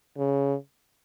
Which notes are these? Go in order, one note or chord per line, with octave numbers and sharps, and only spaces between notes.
C#3